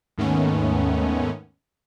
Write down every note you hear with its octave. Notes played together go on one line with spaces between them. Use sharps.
D#2 G#2 D#3 A3 B3 C#4